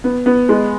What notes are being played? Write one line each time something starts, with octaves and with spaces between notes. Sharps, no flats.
B3
B3
G#3